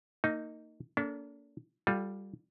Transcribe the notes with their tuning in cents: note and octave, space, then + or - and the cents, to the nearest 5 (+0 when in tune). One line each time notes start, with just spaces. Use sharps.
A#3 -25 D#4 +0
A#3 +0 D4 -40 A4 +0
G3 +0 F4 +30 A4 +0